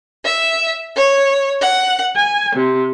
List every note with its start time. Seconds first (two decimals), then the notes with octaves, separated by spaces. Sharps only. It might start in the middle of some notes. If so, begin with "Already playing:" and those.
0.24 E5
0.95 C#5
1.60 F#5
2.16 G#5
2.53 C3